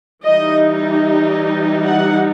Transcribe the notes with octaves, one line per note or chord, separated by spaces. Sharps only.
E3 G3 D#4 D#5
F#5